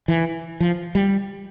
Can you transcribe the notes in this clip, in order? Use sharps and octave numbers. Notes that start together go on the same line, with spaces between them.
E3
F3
G3